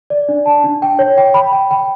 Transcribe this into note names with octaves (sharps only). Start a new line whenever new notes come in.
D5
D4
A5
D4
G5
C#5
G5
B5
G5
G5